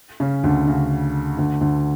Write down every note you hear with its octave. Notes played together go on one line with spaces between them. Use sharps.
C#3 C#4
D2 D3
C#3
D2 D3
D2 D3